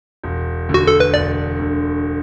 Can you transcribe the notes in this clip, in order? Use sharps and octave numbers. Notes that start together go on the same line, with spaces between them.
E1
D2 D3
F#4
A4
B4
E1 D5
D2 D3